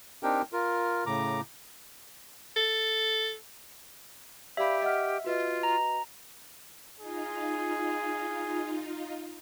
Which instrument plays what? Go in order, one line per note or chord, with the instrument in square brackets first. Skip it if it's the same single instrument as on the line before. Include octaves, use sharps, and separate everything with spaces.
[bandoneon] C4 D4 D#4 G4 A#4 G5
F4 A#4
A2 C#3 A#5 D6
[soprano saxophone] A4
[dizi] G4 [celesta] D5 F5 B5 [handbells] E5
[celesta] D#5 F#5 F6
[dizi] F4 [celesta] F#4 B4 D#5
[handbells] A#5
[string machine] D#4 F4 [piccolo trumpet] G#4